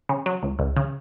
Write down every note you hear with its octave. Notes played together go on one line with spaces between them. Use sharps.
C#3
F#3
C#2
C#2
C#3